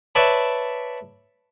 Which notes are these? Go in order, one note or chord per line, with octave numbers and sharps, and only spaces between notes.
B4 C#5 D5 E5 A5 B5